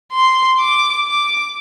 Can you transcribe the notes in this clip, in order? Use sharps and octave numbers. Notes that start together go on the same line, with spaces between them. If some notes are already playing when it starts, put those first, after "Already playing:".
C6
D6
D6